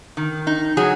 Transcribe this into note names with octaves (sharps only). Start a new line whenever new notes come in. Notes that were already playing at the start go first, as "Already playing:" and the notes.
D#3
D#4
F#3 G#4